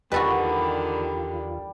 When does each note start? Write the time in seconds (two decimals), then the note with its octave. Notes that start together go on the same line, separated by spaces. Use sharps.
0.12 E2 D3 D#3 G3 F4 F#4 A4 B4